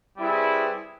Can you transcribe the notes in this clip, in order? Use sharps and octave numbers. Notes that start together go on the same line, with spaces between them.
G3 C4 E4 G#4 B4